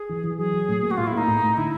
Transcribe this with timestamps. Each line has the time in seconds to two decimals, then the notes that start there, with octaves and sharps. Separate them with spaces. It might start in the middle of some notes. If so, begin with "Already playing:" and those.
Already playing: G#4
0.09 E3
0.24 E3
0.38 F#3 G#4
0.53 F#3
0.68 A2
0.83 A#3
0.91 F#4
0.97 A2 F4
1.07 E4
1.12 A#3
1.17 D#4
1.28 A2
1.42 A2
1.57 D3 E4